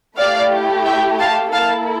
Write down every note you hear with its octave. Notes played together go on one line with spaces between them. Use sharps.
A3 E4 G4 D5 F5
E5 G5
F5 A5
A#3 E4 A4 F5 A5